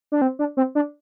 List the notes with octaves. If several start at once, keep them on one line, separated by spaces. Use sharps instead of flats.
D4
C4
D4
C4
D4